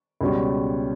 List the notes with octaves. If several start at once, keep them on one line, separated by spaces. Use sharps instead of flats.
C#2 B2 G3 C#4